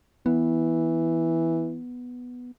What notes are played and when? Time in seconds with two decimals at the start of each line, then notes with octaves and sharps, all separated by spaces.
0.26 E3 B3